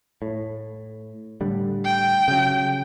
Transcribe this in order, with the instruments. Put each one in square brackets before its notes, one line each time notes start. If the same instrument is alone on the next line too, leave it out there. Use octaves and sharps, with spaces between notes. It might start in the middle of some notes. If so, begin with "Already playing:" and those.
[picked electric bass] A2
A2 D3 G3
[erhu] G5
[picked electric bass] C#3 F#3